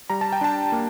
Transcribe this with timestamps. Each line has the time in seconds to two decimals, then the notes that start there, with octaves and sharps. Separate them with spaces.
0.10 G3 A#5
0.21 A5
0.32 G5
0.41 D4 A5
0.72 A#3